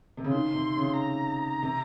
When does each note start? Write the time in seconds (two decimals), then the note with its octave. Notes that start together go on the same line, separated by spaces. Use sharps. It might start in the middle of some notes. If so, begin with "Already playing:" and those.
0.17 C3
0.24 C#3
0.33 D#3 C6
0.54 C3
0.77 C#3
0.98 A#5
1.63 C3